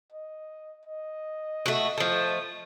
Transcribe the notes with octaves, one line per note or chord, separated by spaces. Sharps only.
D#5
D#5
A3 F#4
F3 A3